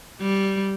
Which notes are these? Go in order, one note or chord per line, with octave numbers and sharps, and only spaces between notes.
G3